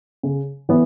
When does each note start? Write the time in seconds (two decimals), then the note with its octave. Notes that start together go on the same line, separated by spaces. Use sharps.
0.23 C#3
0.69 E3 B3